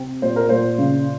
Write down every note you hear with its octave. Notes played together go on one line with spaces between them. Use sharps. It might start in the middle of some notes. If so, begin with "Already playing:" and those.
Already playing: C3 C4
A#2 C5
A#4
A#2 C5
C#3